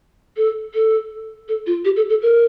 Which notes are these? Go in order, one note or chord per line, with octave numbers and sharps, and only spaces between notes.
A4
A4
A4
F4
G4
A4
A4
A#4